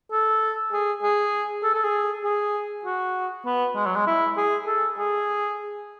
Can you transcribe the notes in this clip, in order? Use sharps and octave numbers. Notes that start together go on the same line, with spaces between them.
A4
G#4
G#4
A4
A4
G#4
G#4
F#4
B3
G#3
F#3
G#3
E4
G#4
A4
G#4